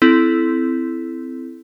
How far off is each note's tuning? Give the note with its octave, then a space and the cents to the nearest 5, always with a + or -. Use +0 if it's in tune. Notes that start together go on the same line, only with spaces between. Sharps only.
C4 -15 E4 +0 A4 -20